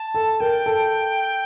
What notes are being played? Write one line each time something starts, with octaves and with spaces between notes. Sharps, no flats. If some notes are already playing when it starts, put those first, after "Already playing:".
Already playing: A5
A4
A#4 G5
A4